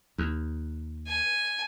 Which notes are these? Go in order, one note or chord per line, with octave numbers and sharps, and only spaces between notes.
D#2
G#5